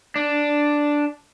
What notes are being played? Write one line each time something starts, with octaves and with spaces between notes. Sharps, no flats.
D4